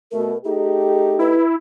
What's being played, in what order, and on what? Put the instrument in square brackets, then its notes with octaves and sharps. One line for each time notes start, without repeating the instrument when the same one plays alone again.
[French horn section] B2 A3 [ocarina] A#4
[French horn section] A3 D#4 G4 [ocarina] G#4
[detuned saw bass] E4 [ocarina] B4